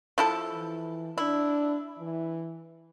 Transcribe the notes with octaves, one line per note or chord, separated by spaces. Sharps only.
F3 E4 A4
E3
D4 E4
E3